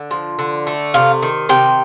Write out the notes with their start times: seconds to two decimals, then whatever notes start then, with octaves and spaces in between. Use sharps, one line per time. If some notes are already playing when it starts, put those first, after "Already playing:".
Already playing: D3
0.11 F3
0.39 D3
0.67 A3
0.94 C3 F5
1.23 D#3
1.49 C3 G5